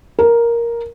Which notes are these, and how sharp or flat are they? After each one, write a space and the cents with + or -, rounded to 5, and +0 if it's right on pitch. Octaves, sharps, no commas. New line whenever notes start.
A#4 +5